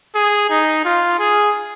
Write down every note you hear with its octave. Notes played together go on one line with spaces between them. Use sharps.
G#4
D#4
F4
G#4